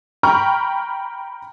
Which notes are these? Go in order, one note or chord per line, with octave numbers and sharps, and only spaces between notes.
G5 A#5 B5 C#6 F6